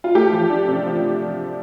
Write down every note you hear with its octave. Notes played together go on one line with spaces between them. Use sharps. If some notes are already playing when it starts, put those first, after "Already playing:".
F4
A3 G4
F3
D4
C3
F3